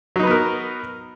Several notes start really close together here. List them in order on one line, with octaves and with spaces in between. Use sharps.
F#3 D#4 B4 B3 A#4